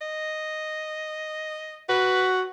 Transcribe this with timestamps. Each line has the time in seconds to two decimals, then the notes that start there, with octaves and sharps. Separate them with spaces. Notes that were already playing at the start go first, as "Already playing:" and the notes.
0.01 D#5
1.89 F#4 B4